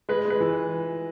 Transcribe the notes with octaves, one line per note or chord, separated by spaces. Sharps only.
G#3 B4
G#3
B4
E3